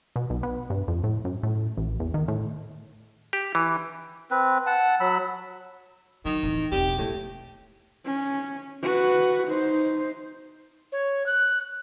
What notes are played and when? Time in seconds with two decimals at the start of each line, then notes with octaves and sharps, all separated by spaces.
0.16 B2
0.30 B1
0.43 B3
0.70 G2
0.88 F2
1.04 A2
1.25 F#2
1.43 A2
1.77 A1
2.00 E2
2.14 D#3
2.28 A2
3.33 G4
3.55 E3
4.31 C4 B4
4.66 F#5 A5
5.00 F#3 B5 E6
6.25 D#3 F#3
6.43 D1 E3
6.71 E1 C4 G4
6.98 A2 G#3 B3
8.06 C#4
8.83 F#4 B4
9.48 D#4 C5
10.92 C#5
11.26 F#6